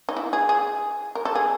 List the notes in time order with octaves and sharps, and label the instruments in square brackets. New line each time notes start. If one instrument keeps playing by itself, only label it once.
[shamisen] D#4
E4
G#4
G#4
A#4
A4
G#4